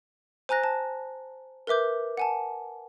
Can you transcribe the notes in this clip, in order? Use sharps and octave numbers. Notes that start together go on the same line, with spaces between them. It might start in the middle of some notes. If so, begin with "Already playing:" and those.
C5 G#5 A#5 F#6 A#6
A5
A#4 B4 E5 D6 G6
F#5 G#5 A5